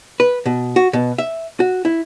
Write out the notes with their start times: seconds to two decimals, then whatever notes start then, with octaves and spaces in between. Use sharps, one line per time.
0.20 B4
0.46 B2
0.76 F#4
0.93 B2
1.18 E5
1.60 F#4
1.85 E4